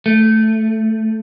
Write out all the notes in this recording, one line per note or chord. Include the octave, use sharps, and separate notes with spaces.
A3